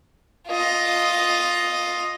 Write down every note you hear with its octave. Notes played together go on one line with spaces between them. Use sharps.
F4 D#5